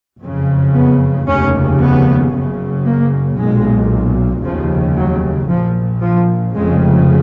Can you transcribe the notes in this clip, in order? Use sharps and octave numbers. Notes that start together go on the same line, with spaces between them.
F#1 F2 C#3
B3
F1 D#2 C#3 C#4
B3
F#1 F#2 C#3
A#3
B1 A#2 G#3
F1 D#2 C#3 F3
F#3
A#1 A#2 F3
F3
F1 F2 C#3 G#3